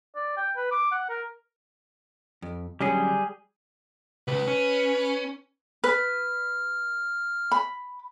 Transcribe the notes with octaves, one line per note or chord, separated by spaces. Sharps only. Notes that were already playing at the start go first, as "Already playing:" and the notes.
D5
G5
B4
D6
F#5
A#4
F2
D3 F#3 G3 C#4 G#4
C#2 C#3 B4
C#4
B4 F6
B5